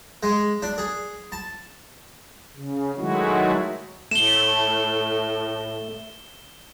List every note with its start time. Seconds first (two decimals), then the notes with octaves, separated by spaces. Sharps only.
0.23 G#3
0.62 D4
0.78 G#4
1.32 A5
2.55 C#3
2.97 D#3 F#3 G#3 A3 E4 F#4
4.11 A2 A3 E7 G7